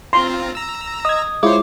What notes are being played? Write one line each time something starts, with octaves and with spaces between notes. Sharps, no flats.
C4 F4 A#5 C6
A#5 E6
D#5 D#6 G#6
G#3 E4 F4 C5 C#5 D6